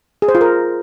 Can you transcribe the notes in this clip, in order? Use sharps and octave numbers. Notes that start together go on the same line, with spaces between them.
G#4
C5
F4
A#4